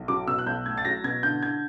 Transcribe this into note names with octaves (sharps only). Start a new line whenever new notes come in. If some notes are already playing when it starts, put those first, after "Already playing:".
Already playing: B1
F#3 D6
B2 E6
F#6
B1 G6
A3 G#6
A6
F#3 A#6
B2 G#6
D3 G6
D3 G#6